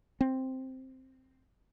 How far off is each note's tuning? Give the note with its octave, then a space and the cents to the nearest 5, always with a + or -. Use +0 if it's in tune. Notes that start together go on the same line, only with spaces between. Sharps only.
C4 +0